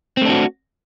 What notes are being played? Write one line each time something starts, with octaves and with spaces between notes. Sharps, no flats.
A3 C4 D4 F#4